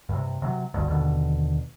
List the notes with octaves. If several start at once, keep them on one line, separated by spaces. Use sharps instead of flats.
G2 C3
C3 F#3
G1 D2 G2
D#2 B2 D3